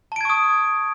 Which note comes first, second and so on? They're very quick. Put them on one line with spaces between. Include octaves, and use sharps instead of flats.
A5 D7 G#6 C#6 D#6